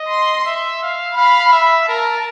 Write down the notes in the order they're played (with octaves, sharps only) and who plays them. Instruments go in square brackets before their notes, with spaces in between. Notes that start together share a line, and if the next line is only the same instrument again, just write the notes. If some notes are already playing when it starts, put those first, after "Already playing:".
Already playing: [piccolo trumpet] D#5
[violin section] C6
[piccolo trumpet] E5
F5
[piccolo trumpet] F5 [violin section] B5
[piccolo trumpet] E5
[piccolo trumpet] A#4 [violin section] A5